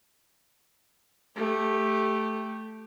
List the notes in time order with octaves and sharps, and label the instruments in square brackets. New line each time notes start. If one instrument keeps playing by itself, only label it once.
[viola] A3 G4